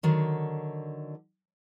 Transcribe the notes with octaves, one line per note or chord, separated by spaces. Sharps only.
D3 D#3 F#3